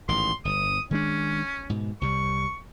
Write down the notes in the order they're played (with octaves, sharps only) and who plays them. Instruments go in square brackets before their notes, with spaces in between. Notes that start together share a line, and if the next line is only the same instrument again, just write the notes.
[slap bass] A1 G#2 D#3 [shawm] C6
[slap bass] G1 [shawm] D#6
[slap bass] D#3 G#3 D4 [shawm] C#4
[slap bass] G#2 B2
[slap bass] C2 C3 G3 [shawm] C#6